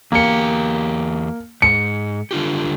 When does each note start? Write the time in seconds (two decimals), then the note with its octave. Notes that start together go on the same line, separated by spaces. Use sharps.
0.12 E2 A#3 G4 C#7
1.62 G#2 C#7
2.31 D3 F4 G4